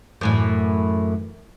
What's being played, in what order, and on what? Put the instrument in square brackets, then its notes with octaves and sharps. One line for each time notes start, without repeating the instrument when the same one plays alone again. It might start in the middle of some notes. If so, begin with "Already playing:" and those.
[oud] F#2 A2 E3